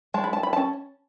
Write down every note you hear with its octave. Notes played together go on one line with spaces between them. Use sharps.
G#3 A5
B5
A5
B5
C#4 A5